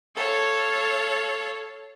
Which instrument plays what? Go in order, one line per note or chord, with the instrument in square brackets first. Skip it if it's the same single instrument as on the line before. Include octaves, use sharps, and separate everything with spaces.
[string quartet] A4 C#5 F5